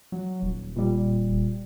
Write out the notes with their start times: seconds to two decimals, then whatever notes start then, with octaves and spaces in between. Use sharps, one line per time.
0.12 F#3
0.42 D#1
0.76 A#2 G3